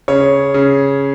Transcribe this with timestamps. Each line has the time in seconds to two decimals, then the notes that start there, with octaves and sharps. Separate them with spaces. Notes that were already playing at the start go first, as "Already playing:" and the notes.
0.08 C#3 C#5
0.54 C#3